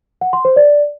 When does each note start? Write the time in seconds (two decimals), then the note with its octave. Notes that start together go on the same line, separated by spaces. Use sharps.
0.21 F#5
0.33 C6
0.45 C5
0.56 D5